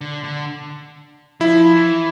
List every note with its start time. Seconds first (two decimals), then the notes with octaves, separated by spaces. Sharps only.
0.01 D3
0.24 D3
1.40 F3 E4
1.76 E3